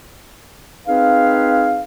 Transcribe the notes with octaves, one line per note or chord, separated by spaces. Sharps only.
C4 D#4 G#4 B4 F5